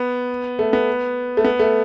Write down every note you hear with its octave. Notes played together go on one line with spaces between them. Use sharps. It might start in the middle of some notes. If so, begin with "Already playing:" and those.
Already playing: B3
A3
B3
A3
B3
A3